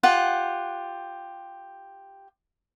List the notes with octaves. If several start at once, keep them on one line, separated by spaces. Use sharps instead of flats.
F4 G4 F#5